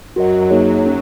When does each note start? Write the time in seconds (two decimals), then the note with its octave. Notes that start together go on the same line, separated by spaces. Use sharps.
0.15 F#2 F#3 F#4 A#4 D#5 F#5
0.51 F#2 F#3 A#3 D#4 G#4 C#5
0.86 C#4